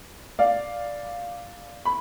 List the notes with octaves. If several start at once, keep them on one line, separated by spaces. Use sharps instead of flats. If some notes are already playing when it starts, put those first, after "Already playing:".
D5 F5
B5